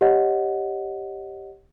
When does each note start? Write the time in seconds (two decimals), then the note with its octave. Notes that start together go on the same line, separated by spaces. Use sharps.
0.01 G4 C#5 D#5 F#5